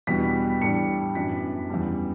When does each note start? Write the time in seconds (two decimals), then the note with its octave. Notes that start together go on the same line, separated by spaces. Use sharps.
0.07 E2 B2 G3 B3 D4 B6
0.61 A2 G3 D4 C#7
1.15 F#2 E3 B3 D4 B6
1.70 E2 C#3 G3